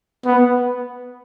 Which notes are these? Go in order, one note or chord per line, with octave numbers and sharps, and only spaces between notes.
B3